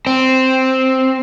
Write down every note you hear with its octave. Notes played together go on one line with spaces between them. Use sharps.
C4